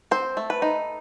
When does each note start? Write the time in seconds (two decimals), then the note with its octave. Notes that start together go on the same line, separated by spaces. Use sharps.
0.11 C4 C5
0.37 A3
0.50 B4
0.62 D#4